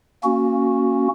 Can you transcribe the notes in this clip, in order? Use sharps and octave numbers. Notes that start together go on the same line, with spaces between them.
A#3 C#4 F#4